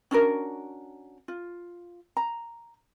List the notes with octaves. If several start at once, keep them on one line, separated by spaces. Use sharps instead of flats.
C#4 D4 F#4 A#4
F4
A#5